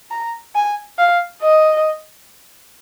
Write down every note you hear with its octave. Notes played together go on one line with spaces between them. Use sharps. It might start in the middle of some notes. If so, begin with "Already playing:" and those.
A#5
G#5
F5
D#5